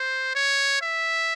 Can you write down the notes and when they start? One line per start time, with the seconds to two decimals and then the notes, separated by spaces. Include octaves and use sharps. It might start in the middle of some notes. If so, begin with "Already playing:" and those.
Already playing: C5
0.35 C#5
0.81 E5